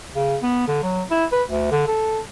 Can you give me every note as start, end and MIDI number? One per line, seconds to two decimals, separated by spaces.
0.16 0.36 49
0.42 0.64 59
0.68 0.81 50
0.83 1.02 54
1.11 1.26 64
1.32 1.43 71
1.48 1.68 38
1.72 1.85 50
1.87 2.20 69